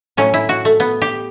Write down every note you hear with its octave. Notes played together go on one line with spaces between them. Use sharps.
A2 F#3 A3 C#4
E4
F#4
A3
B3
G4